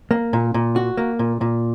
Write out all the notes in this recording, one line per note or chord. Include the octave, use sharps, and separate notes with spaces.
A#3
A#2
A#2
F#4
A#3
A#2
A#2